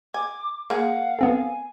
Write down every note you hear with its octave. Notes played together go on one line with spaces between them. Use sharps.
G#5 D6
A#3 G#4 F5 F#5
B3 C4 A4 G#5